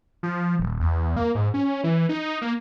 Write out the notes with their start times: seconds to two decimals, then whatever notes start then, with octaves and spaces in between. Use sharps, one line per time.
0.23 F3
0.59 D#1
0.80 E2
1.16 A#3
1.35 G#2
1.54 C#4
1.84 E3
2.09 D#4
2.42 A#3